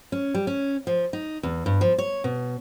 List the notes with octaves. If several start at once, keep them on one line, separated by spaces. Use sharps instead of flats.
C#4
G3
C#4
F3
D#4
E2
G2
F3
C#5
B2